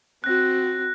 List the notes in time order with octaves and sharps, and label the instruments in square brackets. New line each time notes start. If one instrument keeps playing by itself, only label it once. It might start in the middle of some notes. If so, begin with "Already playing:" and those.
[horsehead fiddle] C4 F#4 [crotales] F#6 A#6